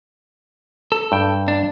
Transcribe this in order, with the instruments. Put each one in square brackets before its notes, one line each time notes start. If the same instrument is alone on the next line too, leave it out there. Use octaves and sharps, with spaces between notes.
[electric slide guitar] A4
[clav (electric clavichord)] G2 G5
[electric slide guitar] D4